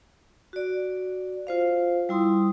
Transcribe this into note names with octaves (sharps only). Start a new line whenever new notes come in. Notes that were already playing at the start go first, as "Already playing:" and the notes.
F#4 D5
F4 C5 F5
G3 E4 C6 D#6